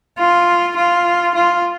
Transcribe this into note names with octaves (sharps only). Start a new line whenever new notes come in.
F4
F4
F4